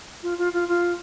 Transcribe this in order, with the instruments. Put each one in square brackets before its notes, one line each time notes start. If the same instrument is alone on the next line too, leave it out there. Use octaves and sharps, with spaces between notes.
[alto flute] F4
F4
F4
F4